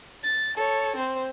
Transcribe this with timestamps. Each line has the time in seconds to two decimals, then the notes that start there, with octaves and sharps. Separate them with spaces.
0.23 A6
0.56 A4 C#5
0.96 C4 C5